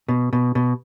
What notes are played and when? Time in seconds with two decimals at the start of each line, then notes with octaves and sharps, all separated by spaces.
0.08 B2
0.33 B2
0.55 B2